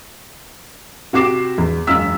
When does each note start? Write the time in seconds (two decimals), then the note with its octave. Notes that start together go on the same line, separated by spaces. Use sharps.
1.13 C3 F#4 G4 D6 C7 E7
1.58 E2
1.87 E1 F#2 F4 E6 F6 B6